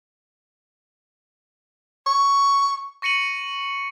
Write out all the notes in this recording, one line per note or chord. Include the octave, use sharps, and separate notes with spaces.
C#6
C#6 A#6 C#7 D#7 F#7